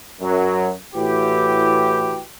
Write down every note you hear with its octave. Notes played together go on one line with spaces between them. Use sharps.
F#2 F#3
A2 E3 F#4 G4